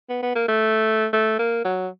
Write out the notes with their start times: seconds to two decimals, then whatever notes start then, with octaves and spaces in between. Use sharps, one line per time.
0.10 B3
0.22 B3
0.35 A#3
0.48 A3
1.13 A3
1.39 A#3
1.65 F#3